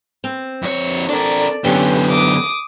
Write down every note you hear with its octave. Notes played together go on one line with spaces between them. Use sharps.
C4
F2 C#5
D4 A4 A#4 D5
F#2 D3 B3 C#4 G4 A4
D6 D#6